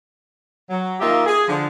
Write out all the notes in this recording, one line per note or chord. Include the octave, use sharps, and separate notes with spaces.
F#3
D#3 A#3 D#4 F4 G4 E5
G#4
D3 F3